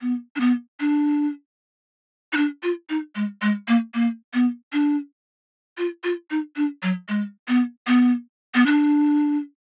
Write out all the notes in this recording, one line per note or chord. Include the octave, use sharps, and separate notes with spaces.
B3
D4
B3
D4
D#4
D4
F4
D#4
G#3
G#3
A#3
A#3
B3
D4
F4
F4
D#4
D4
F#3
G#3
B3
B3
B3
D4